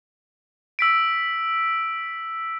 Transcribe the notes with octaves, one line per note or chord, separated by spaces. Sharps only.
E6 B6 D7